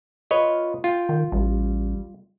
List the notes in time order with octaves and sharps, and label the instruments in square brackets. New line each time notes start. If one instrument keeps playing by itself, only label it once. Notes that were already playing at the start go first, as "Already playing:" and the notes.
[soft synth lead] F4 [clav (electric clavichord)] B4 C#5 D#5
[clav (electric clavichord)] F4 [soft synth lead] G5
[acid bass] D#3
[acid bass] A1 [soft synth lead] G3